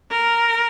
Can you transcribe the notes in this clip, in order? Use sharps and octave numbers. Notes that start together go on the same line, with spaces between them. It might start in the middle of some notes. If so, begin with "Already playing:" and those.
A#4